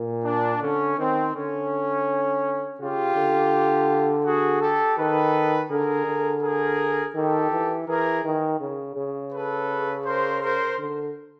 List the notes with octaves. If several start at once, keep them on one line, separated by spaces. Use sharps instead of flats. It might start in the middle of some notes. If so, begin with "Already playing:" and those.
Already playing: A#2
D4
D3 C#4
D#3 C4
D3 C#4
C#3 F4 G4
D3
F#4 G#4
G4 A4
D#3 A4 B4
D3 G#4 A#4
D3
G#4 A#4
D#3 G4 A4
E3
E3 G#4 A#4
D#3
C#3
C#3
A4 B4
A#4 C5
A#4 C5
D3